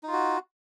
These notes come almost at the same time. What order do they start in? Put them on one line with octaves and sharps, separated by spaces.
D#4 F4 F#4